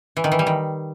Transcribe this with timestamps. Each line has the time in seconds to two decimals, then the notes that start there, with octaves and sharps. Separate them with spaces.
0.17 E3
0.24 D#3
0.32 E3
0.39 G3
0.47 D#3